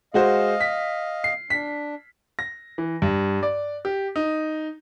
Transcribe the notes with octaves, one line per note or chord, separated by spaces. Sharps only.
G#3 F#4 C5 D#5 F5
B6
C7
D4 B6
A#6
E3
G2
D5
G4
D#4